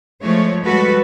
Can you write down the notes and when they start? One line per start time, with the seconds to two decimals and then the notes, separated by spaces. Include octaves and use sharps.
0.21 F3 G#3 A3 C#5
0.65 G3 G#3 F#4 A4 B4